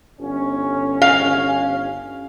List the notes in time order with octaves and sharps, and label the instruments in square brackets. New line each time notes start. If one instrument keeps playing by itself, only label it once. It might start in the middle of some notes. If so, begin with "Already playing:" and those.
[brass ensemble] G1 C#4
[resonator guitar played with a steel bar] F5